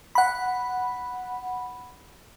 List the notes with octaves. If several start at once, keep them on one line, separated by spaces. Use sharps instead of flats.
F#5 B5